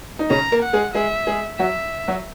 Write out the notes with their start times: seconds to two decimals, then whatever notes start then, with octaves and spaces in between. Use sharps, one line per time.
0.19 D#4
0.30 C#3 C#4 A#5
0.52 A#3 A#4
0.63 F#5
0.73 G#3 G#4
0.94 G#3 G#4 E5
1.27 G#3 G#4
1.59 F#3 F#4 E5
2.08 F#3 F#4